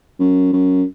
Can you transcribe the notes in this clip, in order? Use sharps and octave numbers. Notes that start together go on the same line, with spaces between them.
F#2
F#2